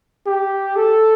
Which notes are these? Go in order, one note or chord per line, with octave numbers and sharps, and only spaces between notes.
G4
A4